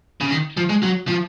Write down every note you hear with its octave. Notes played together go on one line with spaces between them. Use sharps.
C#3
D#3
F3
G#3
F#3
F3